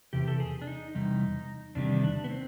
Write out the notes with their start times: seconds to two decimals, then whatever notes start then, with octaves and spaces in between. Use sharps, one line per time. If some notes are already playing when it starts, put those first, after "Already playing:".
0.13 E2 C3 G4
0.28 A4
0.40 G#4
0.62 D4
0.67 D#4
0.95 E2 C3 G3 D#4
1.75 E2 C3 D#3 G3 D4
2.03 D4
2.24 B3
2.30 C4